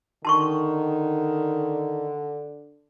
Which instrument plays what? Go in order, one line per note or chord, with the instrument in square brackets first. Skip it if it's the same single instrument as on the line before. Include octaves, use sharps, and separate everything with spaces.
[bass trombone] D3 [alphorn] D#3 [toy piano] A5 C6 C#6